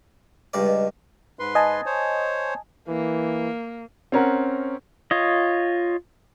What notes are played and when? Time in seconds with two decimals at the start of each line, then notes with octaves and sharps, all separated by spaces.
0.54 C#2 G2 D5
0.66 B4 D#5
1.39 G#2 B4 C6
1.55 D#5 G#5 A5
1.86 C5 C#5
2.88 E3 A#3
4.12 C4 C#4 A#4 F#5
5.11 F4 C#5 D#5